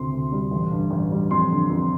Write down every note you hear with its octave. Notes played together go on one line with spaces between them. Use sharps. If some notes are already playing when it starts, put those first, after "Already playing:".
Already playing: D2 C3 C6
D2
G3
A1
G2
A1
G3
F2 C6
D3
F2